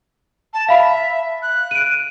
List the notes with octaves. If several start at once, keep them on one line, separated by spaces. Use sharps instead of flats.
A5
E5 F5 B5 B6
F#6
D7 D#7